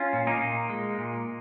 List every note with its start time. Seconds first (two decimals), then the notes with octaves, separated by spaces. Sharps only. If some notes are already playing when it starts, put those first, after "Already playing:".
Already playing: C#4 F4
0.13 A#2
0.27 A#3 D#4
0.41 A#2
0.70 G#3
0.98 A#2